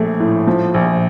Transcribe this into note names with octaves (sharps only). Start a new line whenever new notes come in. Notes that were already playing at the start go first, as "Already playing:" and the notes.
Already playing: A#1 F3 A3
A2
F3
A#1